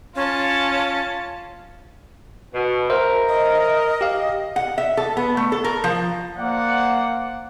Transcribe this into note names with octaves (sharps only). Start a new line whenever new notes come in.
C#4 F4 A5
B2
A#4 C5 E5
D#5
G4 F5
F#5
E5
A4
B3
A3
A4
A#4
F3
A#3 C5 D5 F#5